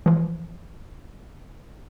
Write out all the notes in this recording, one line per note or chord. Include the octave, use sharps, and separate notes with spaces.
E3 F3